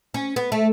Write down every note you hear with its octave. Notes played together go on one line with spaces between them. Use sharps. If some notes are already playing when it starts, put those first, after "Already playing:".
C#4
B3
A3